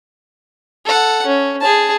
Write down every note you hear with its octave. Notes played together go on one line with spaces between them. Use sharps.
A4 F#5
C#4
G#4 A5